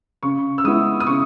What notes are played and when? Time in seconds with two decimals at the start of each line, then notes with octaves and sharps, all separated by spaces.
0.23 C#3 C#6
0.58 E6
0.64 G#3 B3 E4 D#6
1.00 D#6
1.07 C#3 C#6